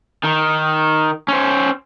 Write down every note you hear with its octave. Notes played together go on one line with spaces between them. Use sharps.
D#3
C#4 C5